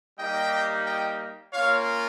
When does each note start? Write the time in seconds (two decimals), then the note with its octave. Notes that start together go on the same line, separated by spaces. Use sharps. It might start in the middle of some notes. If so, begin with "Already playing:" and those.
0.19 G3 A#3 D#4 G4 D#5 G5
0.86 D#5 G5
1.53 A#3 C#4 F4 C#5 F5